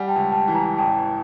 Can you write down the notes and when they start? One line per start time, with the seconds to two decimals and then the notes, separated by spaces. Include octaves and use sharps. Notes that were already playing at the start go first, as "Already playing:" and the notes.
Already playing: G3 F#5 G#5
0.08 G5 A5
0.16 C#2
0.32 G5 A5
0.48 E3
0.55 G#5 A#5
0.78 A1 G5 A5